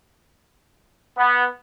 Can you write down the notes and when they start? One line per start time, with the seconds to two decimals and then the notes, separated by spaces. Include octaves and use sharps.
1.17 B3